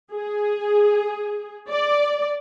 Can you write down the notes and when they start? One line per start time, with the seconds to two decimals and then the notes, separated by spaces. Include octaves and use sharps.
0.13 G#4
1.69 D5